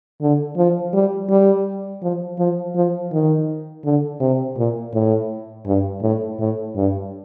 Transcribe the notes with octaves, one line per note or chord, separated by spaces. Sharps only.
D3
F3
G3
G3
F3
F3
F3
D#3
D3
C3
A#2
A2
G2
A2
A2
G2